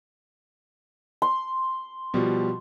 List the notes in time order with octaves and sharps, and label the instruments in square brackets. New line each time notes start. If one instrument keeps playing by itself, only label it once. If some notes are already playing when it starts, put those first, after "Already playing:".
[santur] C6
[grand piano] B2 F3 G3